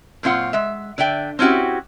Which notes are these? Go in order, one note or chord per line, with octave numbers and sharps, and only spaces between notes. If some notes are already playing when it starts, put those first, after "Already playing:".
F#2 A#2 C4 F4 F#5
G#3 E5
D3 D5 E5 G5
C4 C#4 E4 F#4 G4